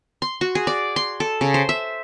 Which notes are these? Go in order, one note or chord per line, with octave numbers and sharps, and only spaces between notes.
C6
F#4
G#4
D5
C6
A4
C#3
C5
E5